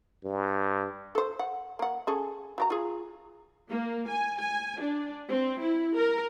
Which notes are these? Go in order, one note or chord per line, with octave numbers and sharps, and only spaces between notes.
G2
A4 C5
F#5
A#3 F#5
C#4 G#4 A4
F#3 G4 A#5
F4 G#4
A#3
G#5
G#5
D4
C4
E4
A#4